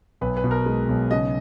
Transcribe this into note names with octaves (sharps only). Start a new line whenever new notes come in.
B1 B4
B4
B2
A#4
G#3
B1
C#3 D#5